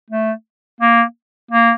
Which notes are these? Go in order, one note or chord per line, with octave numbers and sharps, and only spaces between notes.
A3
A#3
A#3